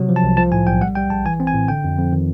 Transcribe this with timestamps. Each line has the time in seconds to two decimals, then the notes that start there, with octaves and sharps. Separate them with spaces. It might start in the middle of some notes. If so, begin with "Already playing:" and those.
Already playing: C3 F#3
0.09 F3
0.16 A5
0.24 C2
0.37 F3 A5
0.52 A2 G#5
0.67 B1 G5
0.81 G3 F#5
0.95 G3 G5
1.10 A#1 A5
1.25 E3 G#5
1.40 C4
1.47 G#5
1.54 A2
1.68 D3 G5
1.84 F2
1.99 F2
2.12 D#3